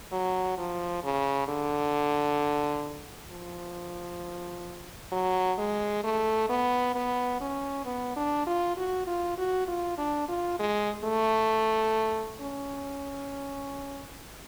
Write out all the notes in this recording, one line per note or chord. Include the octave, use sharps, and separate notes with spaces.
F#3
F3
C#3
D3
F3
F#3
G#3
A3
B3
B3
C#4
B3
D4
F4
F#4
F4
F#4
F4
D4
F4
G#3
A3
C#4